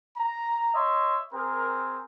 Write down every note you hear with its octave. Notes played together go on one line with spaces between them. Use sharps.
A#5
C#5 D#5 E5 C6
C4 G#4 A#4